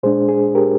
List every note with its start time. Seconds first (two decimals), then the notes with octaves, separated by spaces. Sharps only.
0.03 A#2 G#3 D4 G#4 C5
0.29 G#4
0.55 G4 A#4